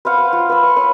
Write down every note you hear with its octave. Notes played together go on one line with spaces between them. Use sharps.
B4 C5 F5 F#5
B4
F4
B4 E6
C#6
B4 C#5 F5